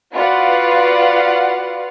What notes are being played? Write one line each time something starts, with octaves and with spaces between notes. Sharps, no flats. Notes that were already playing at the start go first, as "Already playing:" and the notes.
F4 F#4 B4 D5 F5 F#5